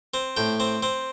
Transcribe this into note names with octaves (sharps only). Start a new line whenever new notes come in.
C4
A2 G5
C4
C4